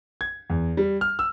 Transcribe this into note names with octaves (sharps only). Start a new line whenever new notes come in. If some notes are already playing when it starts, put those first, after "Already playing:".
G#6
E2
G3
F6
E6